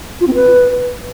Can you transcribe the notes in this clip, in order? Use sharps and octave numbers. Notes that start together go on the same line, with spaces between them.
F4
C4
B4